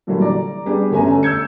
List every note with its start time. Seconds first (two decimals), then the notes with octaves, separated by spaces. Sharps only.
0.07 A#2 D3 E3 F#3 G3
0.21 D5 A#5
0.66 G3 B3 D4 G4 G#4
0.91 G1 A3 C#4 G#5 A#5
1.23 E6 G6 G#6 C#7